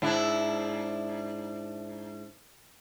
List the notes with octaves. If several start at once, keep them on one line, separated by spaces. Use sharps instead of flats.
G#2 D4 E4